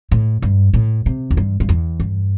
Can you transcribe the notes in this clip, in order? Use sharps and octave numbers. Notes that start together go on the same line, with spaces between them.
A2
G2
A2
C3
E2
G2
G2
E2
G2